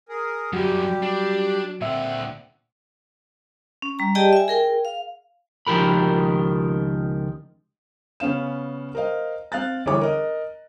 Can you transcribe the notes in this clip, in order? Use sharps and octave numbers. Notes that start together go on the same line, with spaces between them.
G#4 A#4
F#2 D3 F#3 G3 F#4 G4
D4
A#2 D3 C4 E5 F#5
C#4
G3 A#5
G4 G#4 D5 D#5 G5 A5
E5 G#5
G#4 A#4 G5
F5
C#2 D#3 F3 G4 A#4 B5
C#3 B3 C#4 F5 E7
A#4 C5 D#5 F5
C4 F5 F#6 A6
G1 E3 G#4 C#5 D6
A#4 D#5